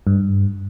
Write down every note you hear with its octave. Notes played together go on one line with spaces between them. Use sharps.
G2